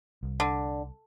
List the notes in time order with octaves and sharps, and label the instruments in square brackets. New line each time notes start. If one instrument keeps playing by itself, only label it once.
[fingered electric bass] C2
[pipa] D3